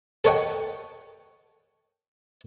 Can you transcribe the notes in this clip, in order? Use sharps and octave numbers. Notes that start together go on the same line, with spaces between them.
A4 A#4 C#5 D#5 F#5 G5